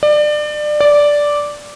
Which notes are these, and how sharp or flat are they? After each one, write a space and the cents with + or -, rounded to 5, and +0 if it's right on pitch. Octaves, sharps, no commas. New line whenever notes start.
D5 +25
D5 -5